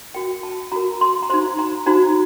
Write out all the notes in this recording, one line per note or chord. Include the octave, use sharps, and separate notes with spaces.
F#4 A#4 G5
A5
F#4 A#4 A#5
C6
A#5
D#4 F#4 C5 C6
A#5
D#4 F#4 C5 A#5